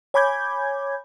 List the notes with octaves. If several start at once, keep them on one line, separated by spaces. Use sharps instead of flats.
C#5 G#5 B5 D6 G6 G#6